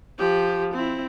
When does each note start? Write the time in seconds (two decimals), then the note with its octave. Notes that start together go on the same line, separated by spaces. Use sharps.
0.19 F3 G4
0.74 C4 E4